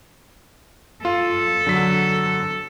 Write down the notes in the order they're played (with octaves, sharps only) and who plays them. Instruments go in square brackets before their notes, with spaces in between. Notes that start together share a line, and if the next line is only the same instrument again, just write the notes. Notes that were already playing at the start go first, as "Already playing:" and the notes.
[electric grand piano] F4 [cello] A4
[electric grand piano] D3 F#3 B6